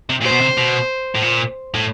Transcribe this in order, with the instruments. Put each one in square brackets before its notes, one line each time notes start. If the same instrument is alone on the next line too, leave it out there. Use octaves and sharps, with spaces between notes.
[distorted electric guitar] C3
[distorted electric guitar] A#2 [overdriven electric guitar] C5
[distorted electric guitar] B2
C3
B2
A2
A#2
A2